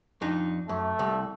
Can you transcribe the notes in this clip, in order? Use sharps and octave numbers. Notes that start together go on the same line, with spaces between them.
F2 D4 D#4
F#2 A3
C2 G3